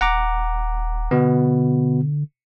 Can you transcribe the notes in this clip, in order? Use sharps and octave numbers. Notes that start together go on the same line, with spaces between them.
D#1 F#5 A#5 D6
B2 D3 B3